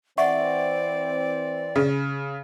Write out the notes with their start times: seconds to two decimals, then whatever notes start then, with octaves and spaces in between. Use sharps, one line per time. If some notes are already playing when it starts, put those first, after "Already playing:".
0.18 E3 C4 D5 E5 F#5 C#6
1.76 C#3 F5